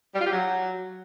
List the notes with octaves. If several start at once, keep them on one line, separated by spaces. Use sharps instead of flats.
G3
F4
G4
F#3